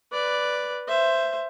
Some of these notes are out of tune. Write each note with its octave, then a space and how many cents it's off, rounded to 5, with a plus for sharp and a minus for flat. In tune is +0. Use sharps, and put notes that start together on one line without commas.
B4 +0 D5 +0
C5 +0 E5 +20